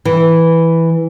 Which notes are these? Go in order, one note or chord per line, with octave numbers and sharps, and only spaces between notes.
E3